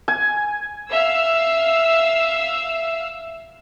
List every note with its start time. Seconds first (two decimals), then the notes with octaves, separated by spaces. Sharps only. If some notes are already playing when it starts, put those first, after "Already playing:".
0.08 G#5
0.91 E5 F5 E6